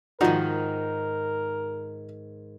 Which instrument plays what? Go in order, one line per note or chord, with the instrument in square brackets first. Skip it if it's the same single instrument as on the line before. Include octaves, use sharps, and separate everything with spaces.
[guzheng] G#2 D#3 [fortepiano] F3 D#4 F#4 [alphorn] A#4